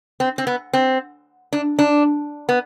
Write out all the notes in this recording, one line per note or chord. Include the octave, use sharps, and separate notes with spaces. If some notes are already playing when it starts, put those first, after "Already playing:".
C4
C4
B3
C4
D4
D4
B3